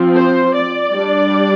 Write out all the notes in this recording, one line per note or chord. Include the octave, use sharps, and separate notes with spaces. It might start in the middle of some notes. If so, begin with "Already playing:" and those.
Already playing: F3 C4
C5
D5
G3 D4